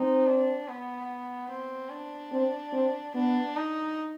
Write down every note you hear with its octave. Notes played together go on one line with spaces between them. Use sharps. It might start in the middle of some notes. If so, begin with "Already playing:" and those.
Already playing: C4 D#4
D4
B3
C4
D4
C4
C4
B3 D4
D#4